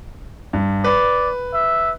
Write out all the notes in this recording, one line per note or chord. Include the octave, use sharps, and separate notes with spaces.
G2
B4 D5
E5